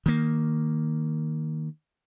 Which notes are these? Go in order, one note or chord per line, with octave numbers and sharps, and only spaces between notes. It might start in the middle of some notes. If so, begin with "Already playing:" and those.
D#3 A#3